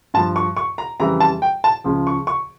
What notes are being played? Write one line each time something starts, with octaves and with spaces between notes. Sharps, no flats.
G2 F3 A5
C#6
C#6
A#5
F2 C#3 E3 G3 A#5
A5
G5
A5
C#2 C#3 F3
C#6
C#6